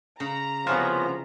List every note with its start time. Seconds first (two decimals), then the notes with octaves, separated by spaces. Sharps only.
0.20 C#3 A#5
0.67 C2 F3 B3 C#4 F4 E5